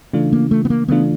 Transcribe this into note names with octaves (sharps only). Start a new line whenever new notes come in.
C#3 E3 A3 D4 F4
A#3
A3
B3
A#3
C#3 E3 A3 B3 D4 F4